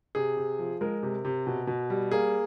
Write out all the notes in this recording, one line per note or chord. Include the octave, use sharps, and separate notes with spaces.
C3 G#4
C3
F3
G#3 A#4
C3
C3
B2
B2
G3
A#3 G#4